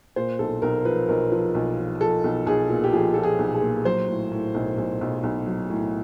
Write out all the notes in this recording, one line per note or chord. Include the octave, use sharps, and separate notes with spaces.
A#2 C5
B1 A4
B1 A#4
F3 B4
B1 A#4
F3
B1
F3
F3 A4
B1
B1 G#4
A#2
G4
F3 G#4
F3 A4
G#4
B1
G#4
A#2
F#3 C5
A2
A2
B1
B1
B1
B1
F#3
A2